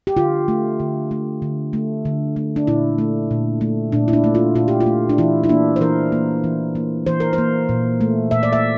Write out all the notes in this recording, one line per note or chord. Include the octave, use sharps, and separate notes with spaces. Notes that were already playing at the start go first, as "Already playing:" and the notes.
G4
D3 F4
A3
D3
A3
D3
A3
D3
A3
D4
A#2 E4
A3
A#2
A3
A#2 D4
E4
D4
A3
F4
A#2 F4
G4
F4
A3
D4
E3 E4
E4
A#3 D4
C5
E3 A#4
A#3
E3
A#3
E3 C5
A#4
C5
A#3
A#2
A3
A#2 E5
D5
E5